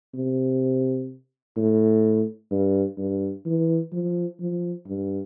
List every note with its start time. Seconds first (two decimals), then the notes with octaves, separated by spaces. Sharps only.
0.14 C3
1.56 A2
2.51 G2
2.98 G2
3.45 E3
3.92 F3
4.40 F3
4.87 G2